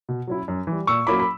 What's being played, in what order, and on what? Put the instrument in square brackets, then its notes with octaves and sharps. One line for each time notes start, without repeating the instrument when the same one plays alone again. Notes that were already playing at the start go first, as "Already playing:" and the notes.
[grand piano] B2
F#3 C#4 E4
F#2
E3
G3
A#2 C#6 E6
F#3 A#3 C#4 E4 B5 D6
B5